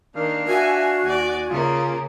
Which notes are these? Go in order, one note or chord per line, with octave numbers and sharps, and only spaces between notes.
D#3 A#3 D4 F5
F#4 E5 G#5
D#2 D5 G#5
C#3 A#3 F4